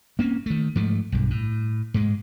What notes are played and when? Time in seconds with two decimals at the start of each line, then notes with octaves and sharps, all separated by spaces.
0.19 A#3 C4 C#4
0.46 D#3 A3
0.76 G#2 F3 A3
1.12 B1 G2
1.31 A2
1.94 G#2 G#3